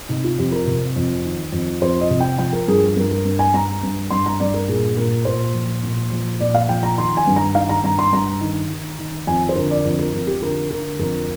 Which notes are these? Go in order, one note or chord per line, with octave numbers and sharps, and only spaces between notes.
C3 D#4
F4
F2 G4
A#4
C3
F2
D#3
F2
F2 C5
D#5
C3
G5
F3 G5
A#4
G2 G#4
G2 A#4
A#4
G2
G#5
G2 A#5
G2
G2 C6
A#5
G2 D5
A#4
A#2 G#4
A#2 A#4
A#2 C5
F3
A#2
F3
A#2 D5
F5
F3 G5
A#5
D#3 C6
G#5
G2
A#5
D#3 F5
A#5
G2 A#5
C6
G2 A#5
D#3
D#3
D#3
F2 G#5
C5
D3 A#4
D5
F2 A#4
A#4
F2 F4
G4
D3 A#4
D3 A#4
F2 A#4